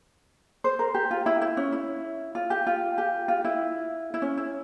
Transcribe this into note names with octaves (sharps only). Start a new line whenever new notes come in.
C5
A#4
G4
F4
E4
E4
C#4
E4
F4
G4
F4
G4
F4
E4
E4
C#4
E4